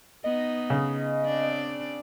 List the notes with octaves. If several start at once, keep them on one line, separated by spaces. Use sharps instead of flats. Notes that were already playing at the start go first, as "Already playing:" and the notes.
B3 D#4 D#5
C#3
C4 D4 D5